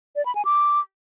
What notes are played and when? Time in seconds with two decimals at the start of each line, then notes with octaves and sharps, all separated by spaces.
0.16 D5
0.26 B5
0.35 G#5
0.45 D6